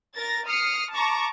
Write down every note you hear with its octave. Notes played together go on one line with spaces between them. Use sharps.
A#4 A6 A#6
D#6 F6 C7 C#7
A5 A#5 C#6 D6